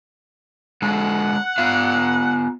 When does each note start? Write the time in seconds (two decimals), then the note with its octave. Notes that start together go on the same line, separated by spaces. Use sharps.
0.82 D3 G#3 A4 F#5
1.58 B3 F4 F5